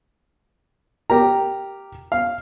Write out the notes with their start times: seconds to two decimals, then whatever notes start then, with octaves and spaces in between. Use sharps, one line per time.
1.10 G4 A#4 A#5
2.12 F5